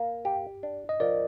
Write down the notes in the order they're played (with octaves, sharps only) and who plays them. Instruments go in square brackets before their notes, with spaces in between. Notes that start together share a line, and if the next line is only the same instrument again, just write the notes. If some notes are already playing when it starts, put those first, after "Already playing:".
Already playing: [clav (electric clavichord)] A#3
G4
D4
[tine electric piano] D#5
[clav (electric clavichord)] F3 [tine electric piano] A#4 D5